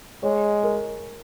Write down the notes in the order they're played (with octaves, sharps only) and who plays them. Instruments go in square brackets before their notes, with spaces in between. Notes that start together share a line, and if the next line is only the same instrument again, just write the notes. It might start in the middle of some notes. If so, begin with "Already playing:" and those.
[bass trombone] G#3 [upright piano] C#5
[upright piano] A#4